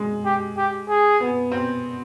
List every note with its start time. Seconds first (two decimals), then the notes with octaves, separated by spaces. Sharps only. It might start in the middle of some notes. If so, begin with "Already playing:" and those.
Already playing: G#3
0.25 G4
0.57 G4
0.89 G#4
1.20 B3
1.51 C4